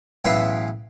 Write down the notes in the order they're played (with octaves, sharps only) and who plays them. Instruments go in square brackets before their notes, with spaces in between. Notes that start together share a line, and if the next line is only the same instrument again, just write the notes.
[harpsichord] B1 A2 C#3 E3 B4 C6